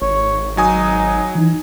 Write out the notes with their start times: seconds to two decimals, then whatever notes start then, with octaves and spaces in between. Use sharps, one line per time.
0.02 G#1 C#5
0.57 F#3 D#4 G#5 D#6
1.35 E3 D#4